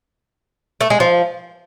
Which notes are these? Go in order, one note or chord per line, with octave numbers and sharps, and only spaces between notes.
A3
G#3
F3